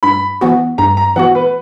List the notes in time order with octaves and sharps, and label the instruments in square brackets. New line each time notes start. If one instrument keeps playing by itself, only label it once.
[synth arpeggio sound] G2 [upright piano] B5
[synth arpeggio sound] E3 B3 F#4
[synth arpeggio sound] G2 [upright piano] A#5
[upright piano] A#5
[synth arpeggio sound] E3 B3 F#4 [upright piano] F#5
[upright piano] B4